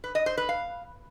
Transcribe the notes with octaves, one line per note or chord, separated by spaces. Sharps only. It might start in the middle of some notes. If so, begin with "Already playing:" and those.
B4
D#5
C5
B4
F5